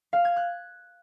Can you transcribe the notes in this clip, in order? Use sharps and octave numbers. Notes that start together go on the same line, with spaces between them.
F5
G#6
F#6